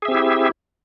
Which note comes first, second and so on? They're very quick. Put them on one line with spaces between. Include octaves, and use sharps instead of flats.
G#4 E5 C4 G4 E4